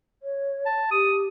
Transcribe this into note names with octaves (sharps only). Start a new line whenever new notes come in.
C#5
A5
G4 D#6